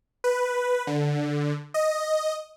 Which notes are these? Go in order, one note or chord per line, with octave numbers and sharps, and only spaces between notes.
B4
D3
D#5